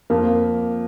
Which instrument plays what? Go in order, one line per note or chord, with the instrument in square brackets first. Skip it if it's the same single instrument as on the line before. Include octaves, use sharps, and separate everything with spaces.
[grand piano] F2 [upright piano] A#3